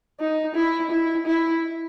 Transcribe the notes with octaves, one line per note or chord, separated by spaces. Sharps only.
D#4
E4
E4
E4